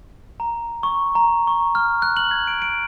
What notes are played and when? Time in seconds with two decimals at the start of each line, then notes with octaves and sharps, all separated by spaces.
0.40 A#5
0.83 C#6
1.15 A#5
1.47 C#6
1.75 F6
2.02 F#6
2.17 F#7
2.31 G#6
2.47 D7
2.62 D7